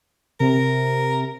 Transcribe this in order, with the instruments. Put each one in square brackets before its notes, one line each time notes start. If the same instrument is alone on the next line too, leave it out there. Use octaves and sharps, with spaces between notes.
[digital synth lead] C3 [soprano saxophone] A#4